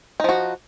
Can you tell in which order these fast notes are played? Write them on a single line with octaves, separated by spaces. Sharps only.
D#4 F3 F#4